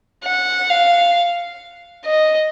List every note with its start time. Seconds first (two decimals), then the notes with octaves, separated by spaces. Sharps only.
0.25 F#5
0.70 F5
2.05 D#5